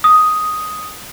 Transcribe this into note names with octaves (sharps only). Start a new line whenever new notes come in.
D#6